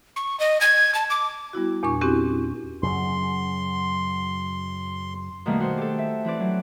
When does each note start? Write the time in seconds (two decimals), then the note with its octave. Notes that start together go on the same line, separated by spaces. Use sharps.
0.16 C#6
0.40 D#5
0.61 G#6
0.95 A5
1.10 D6
1.53 G3 B3 E4 F#4
1.83 E2 A#2 D4 C#6
2.01 C4 C#4 E4 F#4 G4
2.83 F#2 C#3 F#3 C6
5.46 B2 D#3 G3 A3 A#3
5.60 F#4 C5
5.78 G4 A4
5.98 E5
6.25 E3 C4 B4 D5
6.40 F#3